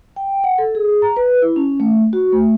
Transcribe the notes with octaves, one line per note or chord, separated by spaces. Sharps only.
G5
F#5
A4
G#4
A#5
B4
E4
C#4
A3
F#4
A3